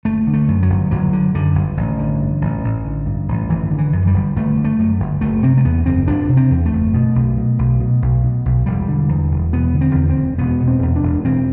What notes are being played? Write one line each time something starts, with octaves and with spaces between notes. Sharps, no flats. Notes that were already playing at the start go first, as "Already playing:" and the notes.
G1 A3
D3
A3
F#2
F#3
G1
G1 F#3
D3
F#2 D3
G1
A1
D3
G2
A1
A1
D3
G2
A1
G1 E3
D3
E3
F#2
G3
G1
G1 A3
D3
A3
F#2
G1
F#1 A3
C3 C4
A3
E2 B3
F#1 C4
F#1 D4
C3
C4
E2
A3
F#1
B2
B1
B2
B1
B2
B1
B2
B1
E1 G3
D3
E2
E1
E1 B3
D3
C4
E2
C4
E1
E1 B3
B2
C4
E2
D4
E1
E1 C4